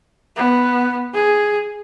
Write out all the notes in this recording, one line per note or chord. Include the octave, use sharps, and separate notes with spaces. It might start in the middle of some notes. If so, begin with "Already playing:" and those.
B3
G#4